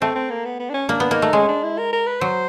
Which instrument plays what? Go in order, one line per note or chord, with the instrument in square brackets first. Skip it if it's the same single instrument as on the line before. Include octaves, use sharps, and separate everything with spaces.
[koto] A3 [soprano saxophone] C4
[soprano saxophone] C4
A#3
B3
B3
D4
C#4
[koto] A#3 [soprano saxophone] D4
[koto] B3
[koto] A#3 [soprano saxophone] D#4
[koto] A3
[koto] G#3 [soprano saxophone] C#4
[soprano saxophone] D4
E4
A#4
A#4
B4
[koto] F#3 [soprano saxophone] C5